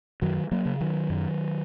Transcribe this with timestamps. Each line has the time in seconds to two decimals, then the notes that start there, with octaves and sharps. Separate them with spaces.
0.22 F#2 D#3 F#3
0.52 F#3 A#3
0.66 C#3
0.80 D#3 F#3
1.10 F#2